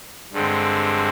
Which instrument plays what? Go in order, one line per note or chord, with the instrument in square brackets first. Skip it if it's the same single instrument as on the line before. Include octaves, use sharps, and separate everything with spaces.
[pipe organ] G2 D3 G#3 C4